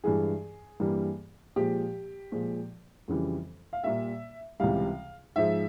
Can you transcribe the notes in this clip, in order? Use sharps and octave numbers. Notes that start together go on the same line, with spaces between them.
G2 E3 G#3 G#4
G2 E3 G3 A#3
A#2 F3 G#3 G4
A#2 F3 G#3
F2 C#3 E3 G3
F5
A#2 G3 A#3 E5
C#2 C3 E3 G3 F5
G#2 F3 G#3 E5